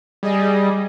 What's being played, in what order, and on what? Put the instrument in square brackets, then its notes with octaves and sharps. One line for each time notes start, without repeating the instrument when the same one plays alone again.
[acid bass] G3 [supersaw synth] G#4 D#5